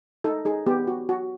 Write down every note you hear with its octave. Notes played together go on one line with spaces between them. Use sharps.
D#4 A4
D#4 G#4
B3 G4
F#4
F#4